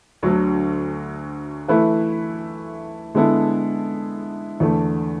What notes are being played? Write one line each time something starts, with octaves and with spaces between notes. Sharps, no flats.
D2 D3 F#3
E3 A3 E4 B4
D3 G#3 B3 E4 A4
E2 D3 A3